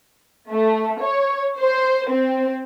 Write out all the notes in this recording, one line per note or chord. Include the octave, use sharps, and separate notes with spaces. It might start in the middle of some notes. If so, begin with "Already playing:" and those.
A3
C#5
C5
C4